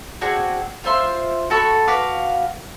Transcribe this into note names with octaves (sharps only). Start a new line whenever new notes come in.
C4 D4 F#4 G#4
F4 C5 E5 C6
F#4 A4 B5 C#6
F#4 B4 F5 D6